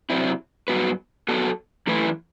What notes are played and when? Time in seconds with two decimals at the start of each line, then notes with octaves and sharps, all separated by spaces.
0.10 C3 F#3 C4 E4
0.68 G2 F#3 B3 F#4 B4
1.28 F#3 B3 F#4 A4
1.87 F#2 E3 A3 E4 B4